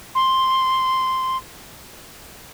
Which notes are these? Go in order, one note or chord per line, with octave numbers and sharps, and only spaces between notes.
C6